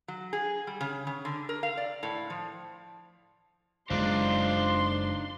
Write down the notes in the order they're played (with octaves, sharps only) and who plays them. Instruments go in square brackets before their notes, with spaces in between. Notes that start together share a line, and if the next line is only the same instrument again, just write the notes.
[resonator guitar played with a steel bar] F#3
G#4
G3
C#3
C#3
D3
A#4
F5
D5
A2
F3
[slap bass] F#1 G#3 [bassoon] F3 [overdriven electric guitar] D4 D#4 [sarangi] C6